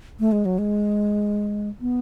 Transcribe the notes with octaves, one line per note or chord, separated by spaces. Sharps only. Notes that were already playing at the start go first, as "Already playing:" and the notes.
A3
G#3
F#3
G#3
B3